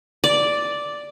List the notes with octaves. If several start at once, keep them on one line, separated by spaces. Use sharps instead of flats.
D5